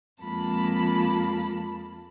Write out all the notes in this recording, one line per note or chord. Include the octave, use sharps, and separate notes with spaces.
F2 G#3 A#3 F4 A5 B5